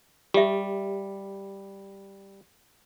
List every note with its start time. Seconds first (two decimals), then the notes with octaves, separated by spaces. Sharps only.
0.34 G3 G4 E5